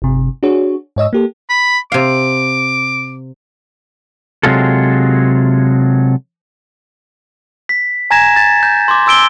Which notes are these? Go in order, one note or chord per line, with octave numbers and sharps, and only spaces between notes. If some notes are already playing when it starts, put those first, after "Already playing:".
G1 C3
D4 F#4 G#4 C#5
G#2 C#5 D#5 E6
A#3 G4 A4
B5
C3 F5 D6
C3 F#3 G#3 F4 A4
B6
G#5 A#5 G#6 A#6 E7
A6
G6
C6 D6
C6 E6 D7 G7